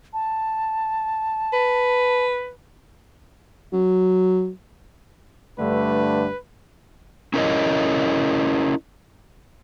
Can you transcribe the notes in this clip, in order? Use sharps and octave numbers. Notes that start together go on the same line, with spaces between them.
A5
B4
F#3
G2 D3 A3 B4
C#4 E4 A#4 B4 C#5 D#5